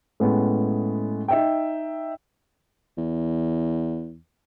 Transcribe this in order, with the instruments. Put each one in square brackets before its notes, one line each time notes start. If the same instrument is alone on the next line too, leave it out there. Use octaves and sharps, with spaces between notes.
[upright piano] A2 G#3 B3 C#4
D#4 E5 G5
[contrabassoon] E2